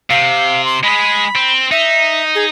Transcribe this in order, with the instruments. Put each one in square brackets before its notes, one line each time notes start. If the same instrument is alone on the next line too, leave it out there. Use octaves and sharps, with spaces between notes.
[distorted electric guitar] C3 [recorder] F5
[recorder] C6
[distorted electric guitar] G#3 G#4 [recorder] B5
[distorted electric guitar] C4
[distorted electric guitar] D#4 [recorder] E5
[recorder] G#4